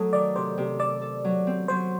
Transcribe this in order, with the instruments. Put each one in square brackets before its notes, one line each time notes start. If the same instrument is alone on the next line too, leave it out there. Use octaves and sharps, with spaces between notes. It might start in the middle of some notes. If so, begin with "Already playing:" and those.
Already playing: [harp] F#3 A3 D#4 [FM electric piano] A4
[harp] D#3 [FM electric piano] D5
[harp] C3 [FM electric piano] C5
[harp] C3
[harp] A4 [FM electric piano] D5
[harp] A4
F#3
C4
[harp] F#3 [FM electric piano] C5